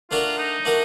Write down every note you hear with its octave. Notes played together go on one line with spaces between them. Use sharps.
A3 D4 F4 F#4 A#4
D#4
A3 D4 F#4 A#4